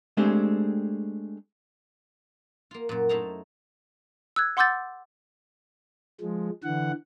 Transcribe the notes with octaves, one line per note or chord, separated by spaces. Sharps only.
G#3 A3 C4 D4 G4 G#4
A#3 F4
F#2 A#2
A3 D#4 E4 C5 A5 A#5
E6 F#6 G#6
F#5 C6 D6 E6 G6 A6
F3 G#3
D3 E3 F#5